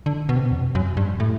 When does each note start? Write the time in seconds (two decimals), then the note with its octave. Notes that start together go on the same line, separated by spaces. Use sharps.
0.06 D3
0.29 B2
0.36 C3
0.43 B2
0.51 E2
0.75 F#2
0.97 G2
1.20 A2